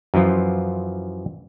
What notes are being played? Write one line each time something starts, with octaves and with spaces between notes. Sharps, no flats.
F#2 E3 F3 F4